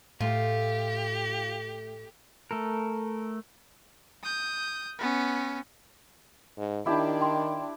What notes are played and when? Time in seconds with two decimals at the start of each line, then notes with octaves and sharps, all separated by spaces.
0.20 A2 A3 F4 G4
2.51 A3 A4 A#4
4.23 D#6 G6
4.99 B3 C#4
6.57 G#2
6.86 D#3 D4 E4 G4 A5
7.21 G5 C6